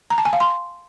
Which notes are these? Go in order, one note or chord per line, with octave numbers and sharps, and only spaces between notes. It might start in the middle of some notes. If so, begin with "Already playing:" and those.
A#5
A5
G#5
F5
C6